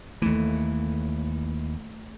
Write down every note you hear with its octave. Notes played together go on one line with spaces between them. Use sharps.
D#2 E3 A3